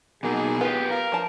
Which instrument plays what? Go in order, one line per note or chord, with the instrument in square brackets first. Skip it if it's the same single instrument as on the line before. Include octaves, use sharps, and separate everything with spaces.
[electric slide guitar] B2 F#3 D#4 [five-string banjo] A#3 [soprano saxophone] G#4
[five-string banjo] B3 [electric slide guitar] F4 G4
[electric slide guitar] A#4 [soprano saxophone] F5
[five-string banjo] F3 A5